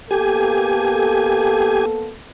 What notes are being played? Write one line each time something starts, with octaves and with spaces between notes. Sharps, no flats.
A#3 B3 G4 A4 G#5